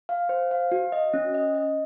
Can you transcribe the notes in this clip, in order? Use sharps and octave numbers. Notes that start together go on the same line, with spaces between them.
F5
C5
F5
F#4
D#5
C#4
D#5
D#5